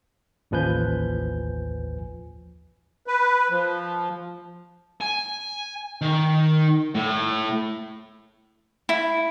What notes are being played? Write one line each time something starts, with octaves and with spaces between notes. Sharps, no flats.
A1 D#2 F3 B4 G#5 G6
B4
F3
G#5
D#3
A2
E4